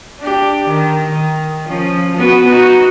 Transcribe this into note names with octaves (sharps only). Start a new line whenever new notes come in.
D4 G4
D#3
D#3
F3 C#4
B3 F#4 B4
D#4 F#4